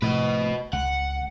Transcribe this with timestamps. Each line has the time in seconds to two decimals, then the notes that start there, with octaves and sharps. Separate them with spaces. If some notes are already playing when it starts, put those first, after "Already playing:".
0.02 A2 C3 F3 B4 D#5
0.73 C#2 F#5